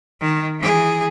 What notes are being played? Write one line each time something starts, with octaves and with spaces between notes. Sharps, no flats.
D#3
E3 G#4